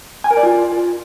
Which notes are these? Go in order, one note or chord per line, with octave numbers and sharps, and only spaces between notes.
G#5
A#4
D5
F4